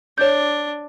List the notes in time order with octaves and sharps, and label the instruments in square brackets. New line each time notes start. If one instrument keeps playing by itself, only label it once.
[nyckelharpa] D4 [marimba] C#5 G6